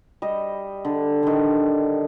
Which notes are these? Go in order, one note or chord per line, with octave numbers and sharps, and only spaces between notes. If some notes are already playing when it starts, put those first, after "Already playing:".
G3 D#5
D3
D3 D#3